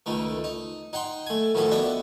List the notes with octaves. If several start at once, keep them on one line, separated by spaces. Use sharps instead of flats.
C#2 D#3 E3 A3
D#4
D#4 F#5 G5 C6
A3 G#5
A2 D#3 F3 F#4 G#4 A4
B3 D4 F#4 D#5 E5 G5